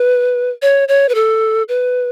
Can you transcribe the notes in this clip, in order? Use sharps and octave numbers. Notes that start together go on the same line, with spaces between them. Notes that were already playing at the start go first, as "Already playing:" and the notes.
Already playing: B4
C#5
C#5
B4
A4
B4